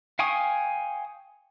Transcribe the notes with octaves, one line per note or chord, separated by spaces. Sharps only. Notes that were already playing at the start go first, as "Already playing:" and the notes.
F5 G5 G#5 C#6 D#6